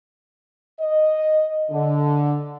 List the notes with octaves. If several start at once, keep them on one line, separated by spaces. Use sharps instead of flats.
D#5
D3